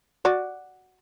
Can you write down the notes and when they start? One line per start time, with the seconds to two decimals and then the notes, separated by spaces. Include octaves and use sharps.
0.25 F#4 D5